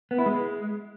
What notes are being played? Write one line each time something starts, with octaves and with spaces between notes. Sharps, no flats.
B3
E4
G#3